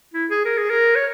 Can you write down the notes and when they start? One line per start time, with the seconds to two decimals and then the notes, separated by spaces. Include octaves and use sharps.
0.14 E4
0.30 G#4
0.45 A#4
0.58 G#4
0.70 A#4
0.95 C#5